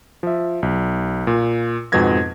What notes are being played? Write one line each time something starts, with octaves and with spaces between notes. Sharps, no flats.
F3 E5
B1
A#2
F2 G#2 B2 B3 G#6 A#6